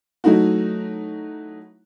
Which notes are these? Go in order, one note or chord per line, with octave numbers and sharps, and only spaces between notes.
F#3 A3 D#4 E4 F#4